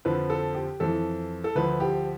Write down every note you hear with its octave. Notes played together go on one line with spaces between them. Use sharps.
F2 D3 F3 B4
A4
G4
F2 E3 A4
A4
D2 D3 F3 B4
G4